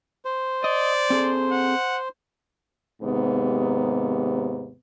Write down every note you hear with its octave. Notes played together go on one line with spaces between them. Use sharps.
C5
D5 D#5
C4 G#4 A4
F#5
D#2 G#2 C3 B3